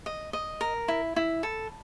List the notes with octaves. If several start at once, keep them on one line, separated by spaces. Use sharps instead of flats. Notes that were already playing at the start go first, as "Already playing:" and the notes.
D#5
D#5
A#4
E4
E4
A4